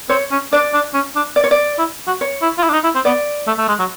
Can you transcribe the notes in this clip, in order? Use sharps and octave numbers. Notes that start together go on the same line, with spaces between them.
C4 C#5
C#4
D4 D5
D4
C#4
D4
D5
C#5
D5
E4
F#4
C#5
E4
F4
E4
D4
D#4
E4
C4
B3 D5
A3
A3
G#3
F#3